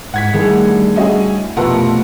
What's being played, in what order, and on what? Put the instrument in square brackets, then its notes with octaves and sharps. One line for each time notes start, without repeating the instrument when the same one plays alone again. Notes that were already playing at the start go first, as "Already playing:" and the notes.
[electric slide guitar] G#2 [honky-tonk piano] F#5 G#6 B6
[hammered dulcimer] A2 D3 [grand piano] D#3 G#4 [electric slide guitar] G3
[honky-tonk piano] C#4 G#4 [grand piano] F#4 D#5 E5
[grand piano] F1 F4 [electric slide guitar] B2 [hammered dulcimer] F3 A3 [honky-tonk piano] A#4 B4 F#5